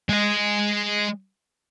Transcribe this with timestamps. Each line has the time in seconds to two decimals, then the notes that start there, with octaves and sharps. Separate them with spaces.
0.09 G#3 D#5